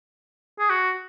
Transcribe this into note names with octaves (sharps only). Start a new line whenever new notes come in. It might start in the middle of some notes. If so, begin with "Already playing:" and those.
G#4
F#4